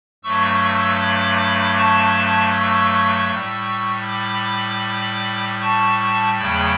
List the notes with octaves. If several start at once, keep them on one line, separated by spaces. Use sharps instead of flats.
G2 F#3 A3 C#6 E6
B5 D6
A5 C#6
C#6 E6
A2 G3
B5 D6
A5 C#6
E2 C#3 F#3 A3 G5 B5